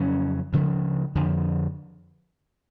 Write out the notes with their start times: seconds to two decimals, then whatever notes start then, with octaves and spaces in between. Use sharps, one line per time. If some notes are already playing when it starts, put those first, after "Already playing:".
Already playing: F2 C#3 F#3 C#4
0.53 D2 C#3 F3
1.15 F2 D3 F3